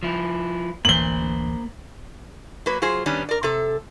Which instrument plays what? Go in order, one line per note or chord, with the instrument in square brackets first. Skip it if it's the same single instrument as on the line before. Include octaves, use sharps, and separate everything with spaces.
[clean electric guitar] F3 E4
[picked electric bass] D1 A1 E3 [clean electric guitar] A#3 C5 [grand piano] F#7 G7
[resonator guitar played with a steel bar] F#3 A#3 B4
F#3 F4 G#4 C5
D#3 G3 B3 C#4 D4
A#4 D5
C3 A4